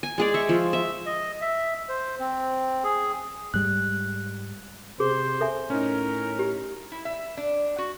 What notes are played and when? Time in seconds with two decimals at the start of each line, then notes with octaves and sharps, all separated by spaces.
0.03 G#5
0.18 G#3 G#4 D5
0.34 E5 C#6
0.49 F3
0.73 E5
1.06 D#5
1.41 E5
1.89 C5
2.20 C4
2.84 G#4
3.54 G#2 G3 G#3 F#6
5.00 C3 G#4 C5
5.41 A4 E5 G#5
5.70 A2 C#4 D#4 A#4
6.39 G4
6.92 E4
7.05 E5
7.37 D4
7.78 F#4